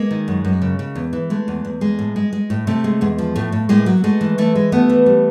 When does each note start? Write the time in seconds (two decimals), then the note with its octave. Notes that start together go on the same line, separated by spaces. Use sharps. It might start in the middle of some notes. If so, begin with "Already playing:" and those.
Already playing: G#3 A#3
0.11 D#3
0.28 F#2
0.45 F#2
0.62 C#3
0.79 C#3
0.95 E2
1.13 E3
1.30 G#3 A3
1.48 E2
1.65 E2
1.81 G#3
1.99 A2
2.16 G#3
2.33 G#3
2.50 A2
2.67 C3 A3
2.84 G#3
3.01 E2 G#3
3.18 F3
3.35 A2 A3
3.52 A2
3.69 A2 G#3 A#3
3.86 F#3
4.04 G#3 A3
4.21 E3
4.38 E3 A3
4.55 G#3
4.72 G3 A3 B3
4.89 E3
5.06 G3